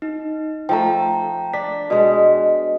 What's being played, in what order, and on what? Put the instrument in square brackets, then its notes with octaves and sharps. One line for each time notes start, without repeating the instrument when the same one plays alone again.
[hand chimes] D#4
[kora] F3 A3 [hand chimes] G5 A#5
[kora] D4 [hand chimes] B6
[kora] B2 G#3